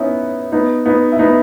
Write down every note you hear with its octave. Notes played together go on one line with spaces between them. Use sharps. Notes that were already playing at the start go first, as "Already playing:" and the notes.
Already playing: B3 C#4 D#4 E4
B3 D#4
B3 D#4
E4
B3 D#4